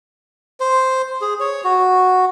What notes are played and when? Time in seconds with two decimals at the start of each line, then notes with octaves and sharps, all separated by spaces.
0.60 C5
1.21 G#4
1.40 C#5
1.64 F#4